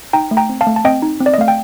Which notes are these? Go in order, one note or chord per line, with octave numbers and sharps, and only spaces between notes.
D#4 G5 A#5
A3
G5 A#5
C4
F5 A5
A3
A5
C4 D#5 G5
D#4
C4
D5
D#5
A3 F5
G5